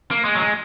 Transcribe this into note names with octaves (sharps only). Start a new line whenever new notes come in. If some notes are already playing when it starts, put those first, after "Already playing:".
A#3
G#3
F#3
G#3